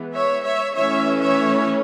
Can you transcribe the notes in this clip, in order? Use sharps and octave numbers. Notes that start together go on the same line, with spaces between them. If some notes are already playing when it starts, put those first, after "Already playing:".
Already playing: E3 G#3 B3
C#5 E5
C#5 E5
E3 A3 C#4 C#5 E5
C#5 E5